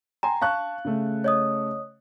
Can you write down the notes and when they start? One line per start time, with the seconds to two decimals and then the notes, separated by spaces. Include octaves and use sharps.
0.23 G5 G#5 A#5 C6
0.42 F5 A5 C#6 F#6
0.85 C#3 A3
1.24 C#5 D#5 D#6